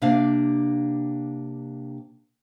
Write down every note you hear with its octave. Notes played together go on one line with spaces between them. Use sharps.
C3 A#3 D4 F5